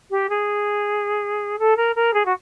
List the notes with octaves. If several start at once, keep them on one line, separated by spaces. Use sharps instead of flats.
G4
G#4
A4
A#4
A#4
G#4
F#4